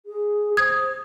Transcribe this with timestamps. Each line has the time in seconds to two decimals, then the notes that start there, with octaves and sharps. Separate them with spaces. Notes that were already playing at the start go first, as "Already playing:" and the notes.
0.06 G#4
0.57 C5 D#6 G#6